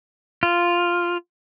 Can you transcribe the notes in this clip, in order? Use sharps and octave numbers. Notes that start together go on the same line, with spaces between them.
F4